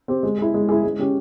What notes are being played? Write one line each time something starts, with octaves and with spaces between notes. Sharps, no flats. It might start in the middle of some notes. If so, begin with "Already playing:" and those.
C4 G4
G#3
E4 G#4
G#3
E4 G#4
G#3
C#4 G4